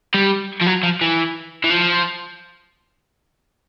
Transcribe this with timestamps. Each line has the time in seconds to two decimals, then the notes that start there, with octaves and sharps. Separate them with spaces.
0.14 G3
0.62 F3
0.67 F#3
0.83 F3
1.01 E3
1.64 E3
1.70 F3